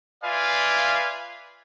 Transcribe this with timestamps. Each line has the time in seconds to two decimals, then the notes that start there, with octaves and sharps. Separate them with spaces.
0.24 F4 B4 D5 E5 F5 G#5